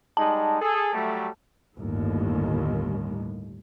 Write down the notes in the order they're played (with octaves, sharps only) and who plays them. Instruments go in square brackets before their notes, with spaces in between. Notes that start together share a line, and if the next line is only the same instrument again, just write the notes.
[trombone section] G3 G#3 D#4 [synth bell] A5
[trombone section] G#4 A4
F#3 G3 A3
[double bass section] G1 D#2 A2